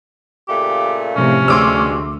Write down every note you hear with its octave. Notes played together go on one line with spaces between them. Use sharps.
A#2 C#3 A3 G4
A2 C3 F3 C#4
D2 G2 G#3 C6 D6 E6